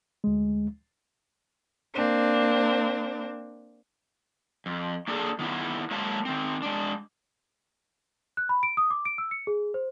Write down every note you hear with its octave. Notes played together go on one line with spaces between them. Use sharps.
D2 G#3
A#3 C4 D4
F2
A#3 D4 G#4 A4
D#3 B3 D#4 E4
F#3 G#3 A#3 E4 F5 A5
D#3 C4
G#3 D4
F#6
B5
D7
D#6
D6
D7
E6
C#7
G#4
C5